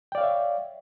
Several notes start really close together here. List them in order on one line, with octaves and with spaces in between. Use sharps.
G5 D5 F5 C#5 E5